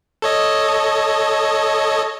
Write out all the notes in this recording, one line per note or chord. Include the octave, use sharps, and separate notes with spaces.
A4 C#5 D#5